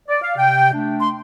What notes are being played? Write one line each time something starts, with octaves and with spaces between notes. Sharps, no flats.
D5
F5
C3 G5
A3 D4
C6